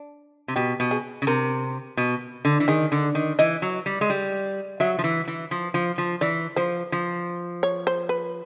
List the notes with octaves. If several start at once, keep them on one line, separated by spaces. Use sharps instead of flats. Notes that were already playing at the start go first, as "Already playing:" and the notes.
Already playing: D4
C3
B2 G4
B2
G#4
C#3
C3 A#4
B2
D3
E3
D#3 G#4
D3
D#3
E3 D#5
F#3
G3
G#3
G3
F#3 E5
F3
E3
E3
F3
F3
F3
E3 D5
F3 C5
F3
C#5
C5
B4